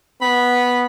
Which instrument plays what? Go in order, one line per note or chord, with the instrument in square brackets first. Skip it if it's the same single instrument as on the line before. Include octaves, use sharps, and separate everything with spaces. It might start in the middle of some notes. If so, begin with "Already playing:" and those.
[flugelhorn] B3 [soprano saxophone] B5